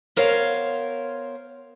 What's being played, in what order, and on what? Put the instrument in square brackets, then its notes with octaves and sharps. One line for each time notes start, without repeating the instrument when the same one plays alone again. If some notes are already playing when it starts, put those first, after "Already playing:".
[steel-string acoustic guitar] B3 A#4 C5 C#5 F5